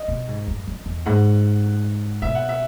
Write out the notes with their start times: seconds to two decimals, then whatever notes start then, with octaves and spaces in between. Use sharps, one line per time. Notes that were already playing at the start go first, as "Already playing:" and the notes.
Already playing: D#5
0.08 B2
0.28 G#2
0.48 F#2
0.67 F#2
0.86 E2
1.06 G#2 F#5
2.22 B2 E5
2.35 F#5
2.49 E5